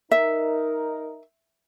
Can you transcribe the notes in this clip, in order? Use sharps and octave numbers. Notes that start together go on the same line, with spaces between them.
D#4 A#4 E5